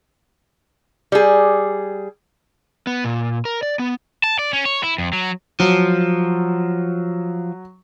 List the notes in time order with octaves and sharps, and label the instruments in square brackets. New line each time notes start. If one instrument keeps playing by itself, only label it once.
[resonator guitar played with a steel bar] G3 G#4
[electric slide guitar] B3
A#2
A#4
D5
B3
[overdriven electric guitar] A5
D5
C#4
C#5
E4
F2
F#3
[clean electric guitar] F3 [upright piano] F#3